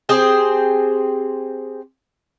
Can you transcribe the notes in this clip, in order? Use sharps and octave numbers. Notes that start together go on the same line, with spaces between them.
C4 G4 G#4 C5